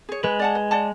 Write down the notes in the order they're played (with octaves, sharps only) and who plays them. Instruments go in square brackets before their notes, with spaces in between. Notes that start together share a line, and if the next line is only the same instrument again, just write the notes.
[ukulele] G#4 C#5
[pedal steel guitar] G#3 [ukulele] B4
[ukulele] D5 F#5 A5
B4
D5 F#5 A5